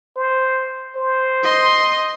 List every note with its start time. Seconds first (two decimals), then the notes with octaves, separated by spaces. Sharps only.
0.16 C5
0.96 C5
1.43 D#5 C6